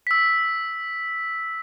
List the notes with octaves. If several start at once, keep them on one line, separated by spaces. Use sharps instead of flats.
E6 B6